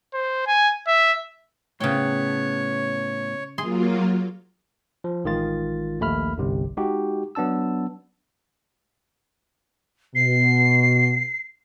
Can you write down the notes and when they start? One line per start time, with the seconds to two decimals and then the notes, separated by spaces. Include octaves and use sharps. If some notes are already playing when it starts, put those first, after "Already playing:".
0.14 C5
0.47 G#5
0.87 E5
1.80 A2 C#3 B3 C#5 G5
3.58 F#3 A#3 F4 G#4 C6
5.04 F3
5.24 A1 D#3 G#3 F4 A6
6.00 A#1 D#2 A3 B5 F6
6.38 G1 C2 C3
6.77 G#3 D#4 F#4 G4
7.35 F#3 B3 D4 A5 E6
10.15 B2 C7